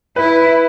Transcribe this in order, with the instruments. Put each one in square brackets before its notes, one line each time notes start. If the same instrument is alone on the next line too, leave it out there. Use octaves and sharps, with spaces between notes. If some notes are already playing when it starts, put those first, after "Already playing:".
[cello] E4 [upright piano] B4